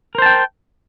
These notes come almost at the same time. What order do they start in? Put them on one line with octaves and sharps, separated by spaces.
A#4 C5 A5 G5